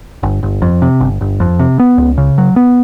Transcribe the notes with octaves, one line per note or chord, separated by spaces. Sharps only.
G1
G1
F2
C3
G1
G1
F2
C3
B3
C#2
C#3
F#3
B3